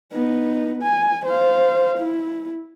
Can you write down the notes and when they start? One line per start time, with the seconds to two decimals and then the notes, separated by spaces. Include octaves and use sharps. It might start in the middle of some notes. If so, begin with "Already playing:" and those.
0.12 B3 D#4
0.83 G#5
1.26 C5 F5
1.98 E4